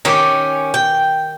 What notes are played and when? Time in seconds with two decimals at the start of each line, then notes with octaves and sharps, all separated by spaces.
0.05 D#3 C#4 G4
0.74 G5